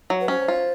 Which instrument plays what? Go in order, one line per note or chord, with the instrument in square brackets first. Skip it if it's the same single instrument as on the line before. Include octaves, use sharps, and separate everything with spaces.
[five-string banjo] F#3
[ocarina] B4
[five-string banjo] C#4 [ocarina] C5
[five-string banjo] F4